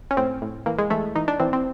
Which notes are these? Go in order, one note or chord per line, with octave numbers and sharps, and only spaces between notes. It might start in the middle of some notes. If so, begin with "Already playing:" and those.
C#4
A2 C4
A2
E3 A#3
G#3
E3 A3
E3 D#4
D4
E3 C4
C4